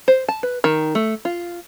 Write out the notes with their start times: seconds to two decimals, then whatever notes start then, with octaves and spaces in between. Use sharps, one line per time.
0.08 C5
0.28 A5
0.43 B4
0.64 D#3
0.95 A3
1.25 F4